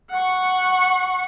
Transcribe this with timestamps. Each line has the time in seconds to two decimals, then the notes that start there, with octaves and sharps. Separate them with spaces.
0.11 F#5 C#6